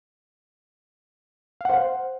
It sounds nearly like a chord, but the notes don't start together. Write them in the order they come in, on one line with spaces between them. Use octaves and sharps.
F5 F#5 C5